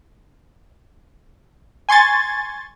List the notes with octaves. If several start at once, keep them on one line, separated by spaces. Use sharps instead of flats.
G#5 C6 C#6 G#6 A6